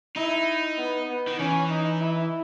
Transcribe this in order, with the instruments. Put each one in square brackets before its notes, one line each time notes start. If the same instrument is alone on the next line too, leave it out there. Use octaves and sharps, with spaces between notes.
[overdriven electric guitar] D#4 [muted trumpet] E4
[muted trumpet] B3
B3
[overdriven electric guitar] D#3
[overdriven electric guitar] E3 [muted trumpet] C#4
[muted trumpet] D#4
E4